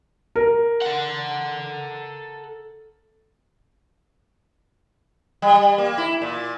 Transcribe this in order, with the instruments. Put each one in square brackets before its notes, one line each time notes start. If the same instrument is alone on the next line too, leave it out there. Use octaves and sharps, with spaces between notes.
[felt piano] A#4
[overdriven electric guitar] A4 F#5
[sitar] G3
A#3
E4
A#2